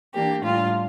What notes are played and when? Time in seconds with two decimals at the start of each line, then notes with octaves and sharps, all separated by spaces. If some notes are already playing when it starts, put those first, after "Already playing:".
0.14 E3 A#3 D4 G4
0.44 A2 G3 D4 F4